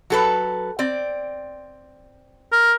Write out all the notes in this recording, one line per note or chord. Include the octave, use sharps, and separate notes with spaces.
F#3 A4 B4
C4 D5
A#4